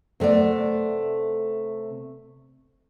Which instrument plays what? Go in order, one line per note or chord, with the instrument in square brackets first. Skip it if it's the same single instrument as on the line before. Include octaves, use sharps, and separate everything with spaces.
[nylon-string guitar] C3 A3 B3 D5